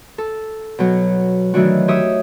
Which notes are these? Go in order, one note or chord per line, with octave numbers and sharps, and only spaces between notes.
A4
B2 F#3
D#3 E3 F#3 A3 D4 F#4
G4 C#5 E5 D#6 E6